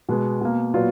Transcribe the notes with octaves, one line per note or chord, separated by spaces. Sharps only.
B2 G#3 B3
B2 A#3
A#2 F#3 B3 F4